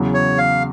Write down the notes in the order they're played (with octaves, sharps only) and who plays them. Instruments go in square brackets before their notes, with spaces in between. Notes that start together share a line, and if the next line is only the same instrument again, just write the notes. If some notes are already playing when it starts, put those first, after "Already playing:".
Already playing: [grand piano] E2 C#3 F#3
[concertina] C#5
F5